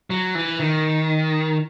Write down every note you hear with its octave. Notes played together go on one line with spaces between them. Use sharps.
F#3
E3
D#3